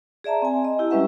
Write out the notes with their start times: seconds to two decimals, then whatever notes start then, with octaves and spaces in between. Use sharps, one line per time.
0.24 G#4 D5 E5 A5 A#5
0.42 C4 G#5
0.65 D#5
0.79 E4 G4
0.90 G3 G#3 C#4 B4 E5 F#5